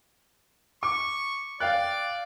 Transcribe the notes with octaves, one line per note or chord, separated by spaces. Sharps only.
C#6 D6
D5 F5 G5 F#6